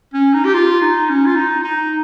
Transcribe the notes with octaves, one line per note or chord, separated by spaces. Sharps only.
C#4
D#4
G4
F4
D#4
C#4
F4
D#4
D#4